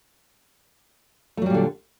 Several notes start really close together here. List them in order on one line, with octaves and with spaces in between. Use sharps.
A3 F#3 G3 A#2 D3